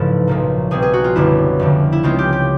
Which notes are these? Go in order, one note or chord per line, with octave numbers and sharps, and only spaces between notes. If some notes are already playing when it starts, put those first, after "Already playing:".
Already playing: A1 G#2 C#3 F3 A4 B4
B1 A#2 F3 A#3
B1 B2 G3 C4 G#4
G#4
F#4
F4
F#1 F#2 D3 G3 B3 E4
F1 F2 D3
E4
C#2 C#3 F3 G#3 C4 F4
G4
G4